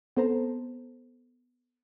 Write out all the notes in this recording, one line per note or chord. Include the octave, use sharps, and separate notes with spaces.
B3 C4 A4 C5 A5 A#5